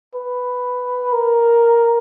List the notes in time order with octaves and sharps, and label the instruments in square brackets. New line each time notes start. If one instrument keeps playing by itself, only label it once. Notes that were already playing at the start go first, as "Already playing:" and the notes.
[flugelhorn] B4
A#4